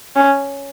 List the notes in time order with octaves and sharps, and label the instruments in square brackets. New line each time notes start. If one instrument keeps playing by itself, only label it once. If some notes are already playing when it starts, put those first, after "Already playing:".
[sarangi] C#4